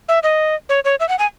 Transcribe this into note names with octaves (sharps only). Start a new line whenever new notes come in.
E5
D#5
C#5
C#5
E5
F#5
G#5